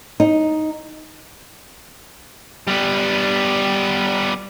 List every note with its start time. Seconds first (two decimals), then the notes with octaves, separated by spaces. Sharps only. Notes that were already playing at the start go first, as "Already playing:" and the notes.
0.20 D#4
2.67 G3 B3